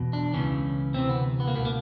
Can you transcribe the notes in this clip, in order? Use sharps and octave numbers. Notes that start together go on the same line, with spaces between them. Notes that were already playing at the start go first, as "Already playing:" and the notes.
Already playing: E2 B2
D4
C#2 C#3 E3 C#4
D2 C3 E3 C4
B3
B3
A#3
C#2 B2 B3
A#3